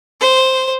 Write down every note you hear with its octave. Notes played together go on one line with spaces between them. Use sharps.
C5